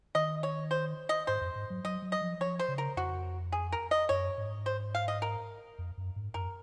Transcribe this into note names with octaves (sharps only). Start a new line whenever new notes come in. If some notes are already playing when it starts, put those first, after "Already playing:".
D#3 D#5
C#5
C5
D#5
G#2 C5
F2
G#2
F#3
F#3 D#5
F#3
D#5
F3
F3 C#5
C5
C#3
A#4
F2 F#4
G#4
A#4
D#5
F#2 C#5
G#2
C5
F5
D#5
A#4
F2
F#2
G#2
F#2 A#4